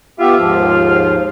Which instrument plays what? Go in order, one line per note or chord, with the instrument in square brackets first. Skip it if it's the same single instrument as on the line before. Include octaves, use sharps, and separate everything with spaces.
[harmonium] B3 G4 E5 [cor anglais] F4
[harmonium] D#2 G#2 F3